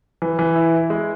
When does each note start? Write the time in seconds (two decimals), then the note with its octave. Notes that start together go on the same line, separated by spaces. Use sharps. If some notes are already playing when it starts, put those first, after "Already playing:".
0.22 E3
0.39 E3
0.56 E4
0.74 E4
0.90 G#3